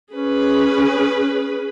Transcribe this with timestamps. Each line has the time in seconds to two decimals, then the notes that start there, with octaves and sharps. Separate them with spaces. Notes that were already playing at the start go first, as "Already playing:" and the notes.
0.13 C#4 G#4 B4